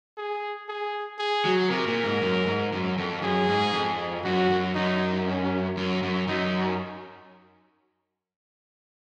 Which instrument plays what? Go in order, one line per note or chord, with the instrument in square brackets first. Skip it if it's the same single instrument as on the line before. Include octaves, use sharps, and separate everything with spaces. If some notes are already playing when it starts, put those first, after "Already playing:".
[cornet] G#4
G#4
G#4
[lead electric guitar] F#3
[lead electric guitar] C3 [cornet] A#4
[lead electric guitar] A#2
G#2
F#2
G#2
F#2
F2
[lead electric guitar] F#2 [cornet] G#4
[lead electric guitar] G#2
F2
[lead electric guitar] F#2 [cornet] F#4
[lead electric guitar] F#2
[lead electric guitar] F#2 [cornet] D#4
[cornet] C#4
[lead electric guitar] F#2
F#2
[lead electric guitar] F#2 [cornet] D#4